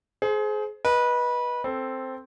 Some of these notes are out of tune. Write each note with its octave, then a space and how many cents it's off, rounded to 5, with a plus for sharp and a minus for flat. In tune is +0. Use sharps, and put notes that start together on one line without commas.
G#4 +30 C5 -5
B4 -20 D#5 +0
C4 +0 A4 +0